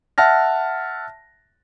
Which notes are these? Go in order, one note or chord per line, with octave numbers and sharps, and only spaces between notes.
E5 F#5 A5 F6 A#6